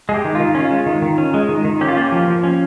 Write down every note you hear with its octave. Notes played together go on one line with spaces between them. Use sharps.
G#3 G#4
G4
D#3
D#3 F4
C#4
F4
G#3
D#3
D#3
C#4
G#3
D#3
D#3
C#4 G4
F4
A#3 G4
F3
F3
C#4